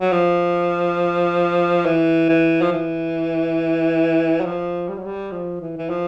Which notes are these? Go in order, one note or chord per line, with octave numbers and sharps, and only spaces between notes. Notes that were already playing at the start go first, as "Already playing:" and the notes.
F#3
F3
E3
E3
F3
E3
F#3
F3
G3
F#3
G3
F3
E3
E3
F3